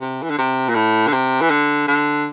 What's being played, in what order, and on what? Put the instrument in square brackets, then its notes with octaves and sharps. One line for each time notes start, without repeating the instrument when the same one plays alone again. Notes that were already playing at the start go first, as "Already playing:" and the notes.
[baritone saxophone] C3
E3
D3
C3
A#2
A2
D3
C3
E3
D3
D3